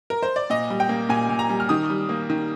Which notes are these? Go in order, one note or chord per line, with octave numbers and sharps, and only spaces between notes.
A#4
C5
D5
A#2 D#5
G3
G5
A#3
A#2 G#5
A#2
A#5
G3
F6
D#3 D#6
G3
A#3
D#3